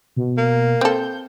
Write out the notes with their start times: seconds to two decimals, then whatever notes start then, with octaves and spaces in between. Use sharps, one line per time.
0.16 B2
0.38 A#3
0.81 C4 A4 G6